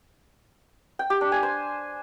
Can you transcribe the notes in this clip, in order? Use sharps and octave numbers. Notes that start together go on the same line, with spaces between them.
G5
G4
D4
G#5
C5